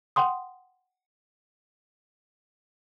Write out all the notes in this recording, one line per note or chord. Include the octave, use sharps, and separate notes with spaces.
F#5 G5 C6 D#6